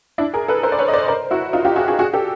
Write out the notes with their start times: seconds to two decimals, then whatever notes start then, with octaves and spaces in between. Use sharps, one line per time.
0.18 D4 E4
0.34 G#4 A#4
0.48 A4 B4
0.63 A#4 C5
0.72 D5
0.78 B4 C#5
0.88 D#5
0.93 C5 D5
1.08 A#4 C5
1.31 E4 F#4
1.53 D#4 F4
1.65 F4 G4
1.76 F#4 G#4
1.88 F#4 G#4
1.99 F#4 G#4
2.13 G4 A4